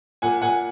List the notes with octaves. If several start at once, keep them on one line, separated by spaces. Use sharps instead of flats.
A#2 F#5 G#5
A#2 F#5 G#5